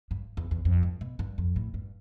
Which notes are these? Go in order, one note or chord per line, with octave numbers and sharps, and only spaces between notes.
G2
E2
E2
F2
G2
B2
G2
F2
A2
G2